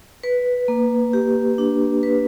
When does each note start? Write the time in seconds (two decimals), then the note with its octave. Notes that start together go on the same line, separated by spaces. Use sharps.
0.23 B4
0.68 A#3
1.13 G4
1.58 D4
2.03 B4